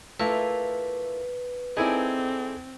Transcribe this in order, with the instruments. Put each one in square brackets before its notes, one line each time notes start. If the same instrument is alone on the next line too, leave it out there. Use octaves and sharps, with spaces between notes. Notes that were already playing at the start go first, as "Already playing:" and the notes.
[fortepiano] A3 [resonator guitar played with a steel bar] A#3 E4 F4 [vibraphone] B4
[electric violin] C4 [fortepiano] D#4 E4 G#5 [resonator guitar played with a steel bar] G#4 A4 D5